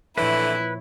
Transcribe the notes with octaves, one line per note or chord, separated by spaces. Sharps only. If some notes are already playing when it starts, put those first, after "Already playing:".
A#2 D3 E3 F3 A3 E4 B4 C#5